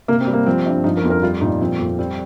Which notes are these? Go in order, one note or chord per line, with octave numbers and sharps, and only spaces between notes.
C3 A#3
C4
G3
A#3
F3 C4
G2
F3 D#4
A#4
F2
A#4
G3 F4
A#2 D#4
F3 C4
F2
G3 C4